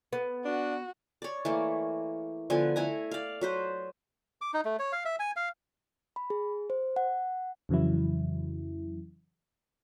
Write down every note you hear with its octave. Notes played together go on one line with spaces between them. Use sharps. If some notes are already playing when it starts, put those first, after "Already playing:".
B3
D4 F#4
C#5 D5
E3 A3 A#3
D3 F3 B3 G#5
A3 E4 G#5 A#5
D5 F5
F#3 B4 C5
D6
D#4
A3
C#5
F5
E5
G#5
F5
B5
G#4
C5
F#5
F2 C#3 E3 F#3 E4